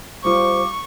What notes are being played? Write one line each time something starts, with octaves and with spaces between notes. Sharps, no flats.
G3 F4 C5 C#6 D6